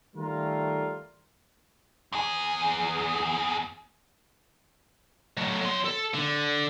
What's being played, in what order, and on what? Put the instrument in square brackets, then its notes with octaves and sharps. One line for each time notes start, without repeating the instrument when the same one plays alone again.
[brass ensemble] D#3 G3 A3 F4 A#4
[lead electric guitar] E2 G#4
[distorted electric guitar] F#3 A3
F#3 C6
A4
D3